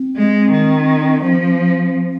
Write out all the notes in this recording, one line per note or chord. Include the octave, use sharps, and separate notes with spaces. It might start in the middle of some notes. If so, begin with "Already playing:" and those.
Already playing: C4
G#3
D#3
F3